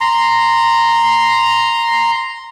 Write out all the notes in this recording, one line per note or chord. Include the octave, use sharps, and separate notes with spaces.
A#5 C6